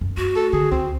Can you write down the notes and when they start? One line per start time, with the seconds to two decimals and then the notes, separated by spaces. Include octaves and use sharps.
0.01 F#2
0.17 A3 F#4
0.36 A4
0.53 D3 G#4
0.71 C#2 C4